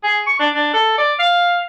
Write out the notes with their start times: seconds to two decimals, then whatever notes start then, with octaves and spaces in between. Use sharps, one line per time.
0.03 G#4
0.26 C#6
0.39 D4
0.54 D4
0.73 A4
0.98 D5
1.19 F5